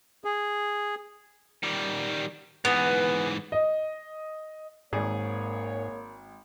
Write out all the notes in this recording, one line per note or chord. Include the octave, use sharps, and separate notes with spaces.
G#4
D#3 G3
G#2 E3 B3
D#5
G#1 G#2 A#3 G#4 C#5